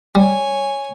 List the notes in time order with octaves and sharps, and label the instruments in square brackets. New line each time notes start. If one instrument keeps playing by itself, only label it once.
[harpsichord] G3 [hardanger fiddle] C#5 G#5